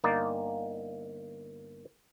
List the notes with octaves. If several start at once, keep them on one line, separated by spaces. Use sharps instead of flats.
G1 A#3 D#4 D5